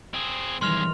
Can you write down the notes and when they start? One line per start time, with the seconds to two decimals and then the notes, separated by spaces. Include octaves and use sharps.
0.14 C4 G#4
0.61 B1 D#3 E3 G3 G#3 C6 F6 F7